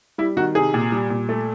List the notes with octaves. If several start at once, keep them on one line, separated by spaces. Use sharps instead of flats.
G3 E4
D#3 F#4
C3 G#4
A#2
G3
A#2
A3